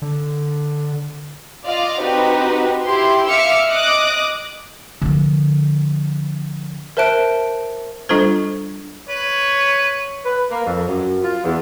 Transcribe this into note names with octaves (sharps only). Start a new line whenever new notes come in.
D3
F4 D5 D#5 F5
C4 D#4 F#4 G4 B4
E4 G4 C6
E5 F5 D6 E6 F6 C#7
D#5 D6 D#6 F#6
D3 F3
A#4 C5 E5 A5 F#6 D7
G3 D4 F4 A4 C5
B4 C#5
B4
A#3
F2
F#2
F4
E2